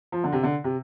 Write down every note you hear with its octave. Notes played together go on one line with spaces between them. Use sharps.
F3
D3
C3
D3
C3